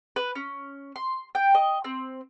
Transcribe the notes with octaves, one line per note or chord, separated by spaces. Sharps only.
B4
C#4
C6
G5
D#5
C4